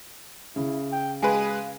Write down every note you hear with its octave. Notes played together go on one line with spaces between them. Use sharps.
C#3 E4
G5
G#3 F#4 G#4 B4 F5 G#5